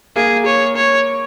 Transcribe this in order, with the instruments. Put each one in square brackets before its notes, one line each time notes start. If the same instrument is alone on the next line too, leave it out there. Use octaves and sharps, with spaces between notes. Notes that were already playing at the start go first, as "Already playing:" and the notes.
[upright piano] A#3 [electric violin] G#4
[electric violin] C#5
C#5